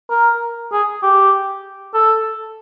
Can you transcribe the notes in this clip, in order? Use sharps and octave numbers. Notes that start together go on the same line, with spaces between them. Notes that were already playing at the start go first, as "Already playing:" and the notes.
A#4
G#4
G4
A4